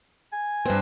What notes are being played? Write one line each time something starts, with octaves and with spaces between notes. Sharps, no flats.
G#5
G2 C4 B4